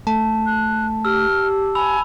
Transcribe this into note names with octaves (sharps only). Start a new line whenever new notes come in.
A3 A5
F#6
G4 E6 F6
G#5 B5 E6 F7